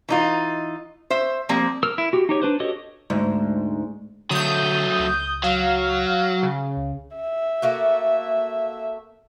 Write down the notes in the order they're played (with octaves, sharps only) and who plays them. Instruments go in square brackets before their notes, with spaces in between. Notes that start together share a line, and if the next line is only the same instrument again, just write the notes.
[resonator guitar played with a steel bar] E3 D#4 F4
C5 E5
F3 G3 A#3 C4
[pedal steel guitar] A#4 E6 F6
E4
F#4 G4
D#4 G4 C#5
D4 B4 C5
F#4 G4 A4 C#5 D#5
[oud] D2 G#2
[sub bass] D3 [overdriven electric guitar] F#3 A3 [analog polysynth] D#6 G6
[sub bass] C#2
[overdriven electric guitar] F#3 [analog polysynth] F5
[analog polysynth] C#3
[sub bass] C#2
[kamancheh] E5
[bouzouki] A3 A#3 F#4